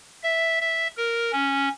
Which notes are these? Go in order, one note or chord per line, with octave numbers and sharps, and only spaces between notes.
E5
E5
A#4
C#4